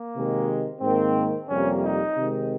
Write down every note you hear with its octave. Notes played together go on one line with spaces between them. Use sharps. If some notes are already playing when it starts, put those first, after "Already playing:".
Already playing: A#3
C3 D#3 G#3
G#2 D#3 A#3 C4
F2 C3 G3 A#3 C#4
D#4
C3 D#3 G#3